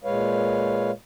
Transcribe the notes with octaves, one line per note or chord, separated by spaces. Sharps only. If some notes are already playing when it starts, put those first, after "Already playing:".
A#2 G#3 B4 C#5 F5